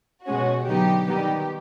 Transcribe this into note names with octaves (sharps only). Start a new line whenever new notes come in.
B2 G#3 C#4 F#4
D3 F#3 B3 D#4 G4
D#3 G3 B3 D#4 G4